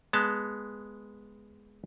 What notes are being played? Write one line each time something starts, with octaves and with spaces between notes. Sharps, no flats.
G#3 B3 A5